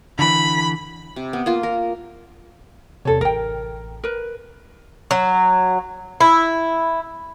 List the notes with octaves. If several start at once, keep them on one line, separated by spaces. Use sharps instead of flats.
D3 E3 B5
C3
B3
A#3 F4
A#4
E2 C3 A4 C#5
A1 A#4 G5
A#4 B4
F#3
E4